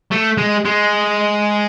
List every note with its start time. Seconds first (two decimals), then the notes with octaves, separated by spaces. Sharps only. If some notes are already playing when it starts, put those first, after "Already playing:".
0.11 A3
0.38 G#3
0.65 G#3